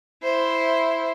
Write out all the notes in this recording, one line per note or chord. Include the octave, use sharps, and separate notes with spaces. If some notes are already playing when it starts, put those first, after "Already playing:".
E4 C5